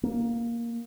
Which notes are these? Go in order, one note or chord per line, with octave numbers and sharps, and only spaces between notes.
A#3